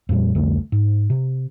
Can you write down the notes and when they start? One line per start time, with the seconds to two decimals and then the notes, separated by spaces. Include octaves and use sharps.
0.09 F2 A#2 G3
0.35 C2 F2 D3 A3
0.72 G#2
1.10 C3